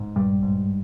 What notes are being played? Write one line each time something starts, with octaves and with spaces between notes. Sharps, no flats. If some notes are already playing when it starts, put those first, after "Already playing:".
Already playing: G#2
A#1 G2 G3
G#2